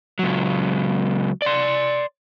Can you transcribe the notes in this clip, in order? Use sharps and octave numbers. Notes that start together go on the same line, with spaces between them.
C#2 F#3
D5 C6